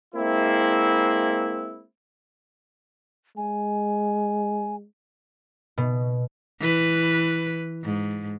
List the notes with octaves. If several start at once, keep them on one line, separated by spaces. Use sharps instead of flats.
G#3 A#3 C4 E4
G#3 G#5
B2
E3 B4
G#2